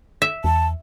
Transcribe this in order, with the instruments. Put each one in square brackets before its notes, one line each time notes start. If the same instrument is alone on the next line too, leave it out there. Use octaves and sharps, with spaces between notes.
[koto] E5
[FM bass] E2 [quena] A5